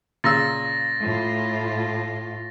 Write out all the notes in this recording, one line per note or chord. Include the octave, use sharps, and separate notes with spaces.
A#2 C#3 E6 A6 A#6
A2 F4